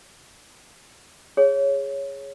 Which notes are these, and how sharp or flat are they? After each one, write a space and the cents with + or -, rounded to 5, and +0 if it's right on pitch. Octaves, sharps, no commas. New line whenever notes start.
G#4 -10 C#5 +0